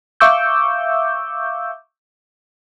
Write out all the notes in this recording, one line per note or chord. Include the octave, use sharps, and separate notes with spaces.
E5 F5 C#6 D6 E6 G6